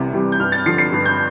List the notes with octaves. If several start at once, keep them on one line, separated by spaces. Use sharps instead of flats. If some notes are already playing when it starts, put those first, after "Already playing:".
Already playing: C2 C3 E3 G3
C3 E3 G3
G6
G2 F6
A6
D3 F3 C7
C7
G2
G6